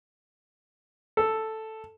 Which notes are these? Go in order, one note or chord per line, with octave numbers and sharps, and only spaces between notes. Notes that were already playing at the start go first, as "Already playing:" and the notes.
A4